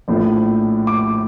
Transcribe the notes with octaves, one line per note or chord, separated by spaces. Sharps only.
A#1 A2 F3
D6